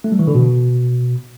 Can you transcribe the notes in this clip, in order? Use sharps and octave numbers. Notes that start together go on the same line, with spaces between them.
A3
G3
E3
D3
B2